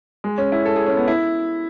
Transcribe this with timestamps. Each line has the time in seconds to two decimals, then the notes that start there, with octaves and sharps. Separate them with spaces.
0.24 G#3
0.38 C#4
0.52 E4
0.65 A4
0.76 G#4
0.86 C#4
0.97 B3
1.08 E4